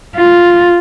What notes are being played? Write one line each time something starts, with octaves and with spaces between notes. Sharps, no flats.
F4